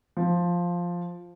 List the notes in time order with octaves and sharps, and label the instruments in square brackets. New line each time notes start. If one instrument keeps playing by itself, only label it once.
[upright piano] F3